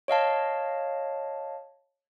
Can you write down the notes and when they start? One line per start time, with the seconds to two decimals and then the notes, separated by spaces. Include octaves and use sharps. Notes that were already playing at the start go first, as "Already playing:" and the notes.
0.08 C#5 D#5 F5 A5